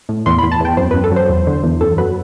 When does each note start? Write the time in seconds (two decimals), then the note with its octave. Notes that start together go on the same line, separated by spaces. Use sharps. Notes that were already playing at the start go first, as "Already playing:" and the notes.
0.09 A2
0.26 E2 C6
0.38 B5
0.43 E2
0.52 A5
0.60 E2 G5
0.77 F#2 C5
0.91 F#2 B4
1.04 A4
1.12 F#3 C5
1.29 E2
1.47 D3
1.63 E2
1.81 F#2 A4
1.98 F#3 B4